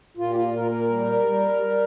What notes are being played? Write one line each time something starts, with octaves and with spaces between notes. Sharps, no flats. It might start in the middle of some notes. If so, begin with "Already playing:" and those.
A#2 F4
G4
F4
A#2 A#4
A#4
G3
G3
G3